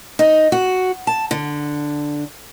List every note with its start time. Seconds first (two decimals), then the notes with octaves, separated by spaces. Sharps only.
0.19 D#4
0.52 F#4
1.07 A5
1.31 D3